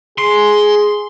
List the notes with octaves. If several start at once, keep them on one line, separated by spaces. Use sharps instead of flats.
G#4 C6